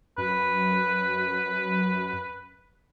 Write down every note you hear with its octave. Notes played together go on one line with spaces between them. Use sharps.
F#2 B4